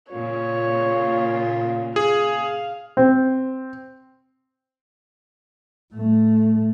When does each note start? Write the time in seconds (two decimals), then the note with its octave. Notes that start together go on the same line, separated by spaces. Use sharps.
0.11 A#2 C#3 F4 C#5
1.96 G#4 F5
2.97 C4
5.94 A2 A3